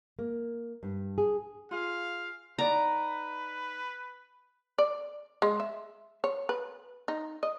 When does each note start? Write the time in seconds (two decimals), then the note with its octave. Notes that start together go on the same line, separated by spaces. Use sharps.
0.19 A#3
0.83 G2
1.18 G#4
1.71 F4 G#4 F5
2.58 D#4 B4 D5 F#5 A#5
4.78 D5
5.42 G#3
5.60 E5
6.24 C#5
6.49 B4
7.08 D#4
7.43 D#5